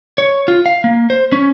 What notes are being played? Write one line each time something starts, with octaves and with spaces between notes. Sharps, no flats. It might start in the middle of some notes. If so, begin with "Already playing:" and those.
C#5
F4
F5
A#3
C5
C#4